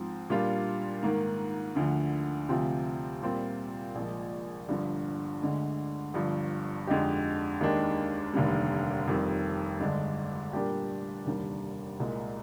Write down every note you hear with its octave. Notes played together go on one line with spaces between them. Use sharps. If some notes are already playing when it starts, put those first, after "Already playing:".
Already playing: G#2 F3 C4
A#2 G3 D4 F4
G#2 D#3 A#3
D2 D3 F3
D2 C3 F3 C4 F4
A#2 G3 C4 F4
A#1 A#2 F3 G#3
G1 G2 D3 F3
D2 D3 G#3
G1 G2 F3
F2 D3 G#3 D#4 G4
D#2 D#3 G#3 D4 G4
F1 D#2 D3 G3
F1 F2 D#3 G3 C4
G1 G2 D3 G#3 D4
A#2 G3 A#3 D4 G4
F1 D#2 D3 G3 D4
C2 A#2 G#3